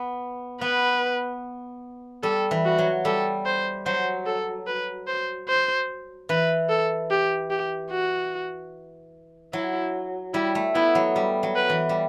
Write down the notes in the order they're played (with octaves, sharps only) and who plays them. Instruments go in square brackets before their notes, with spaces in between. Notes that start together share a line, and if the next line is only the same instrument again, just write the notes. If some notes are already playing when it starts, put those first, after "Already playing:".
Already playing: [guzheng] B3
[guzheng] B3 [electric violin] B4
[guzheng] G3 [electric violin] A4
[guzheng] E3
[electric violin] F#4
[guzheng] F#3
[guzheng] G3 [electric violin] A4
[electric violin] C5
[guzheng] F#3 [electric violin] C5
[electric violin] A4
B4
C5
C5
[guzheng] E3 [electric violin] B4
[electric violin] A4
G4
G4
F#4
[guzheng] F#3 [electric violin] E4
[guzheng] G3 [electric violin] E4
[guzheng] A3
[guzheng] B3 [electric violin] E4
[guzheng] F#3
G3
F#3
[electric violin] B4
[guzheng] E3
G3